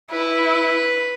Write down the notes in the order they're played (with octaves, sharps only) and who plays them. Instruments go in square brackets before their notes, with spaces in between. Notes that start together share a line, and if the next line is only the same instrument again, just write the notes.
[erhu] E4 [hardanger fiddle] B4